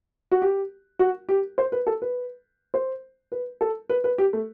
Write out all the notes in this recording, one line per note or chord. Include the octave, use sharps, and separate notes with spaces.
F#4
G4
F#4
G4
C5
B4
A4
B4
C5
B4
A4
B4
B4
G4
A3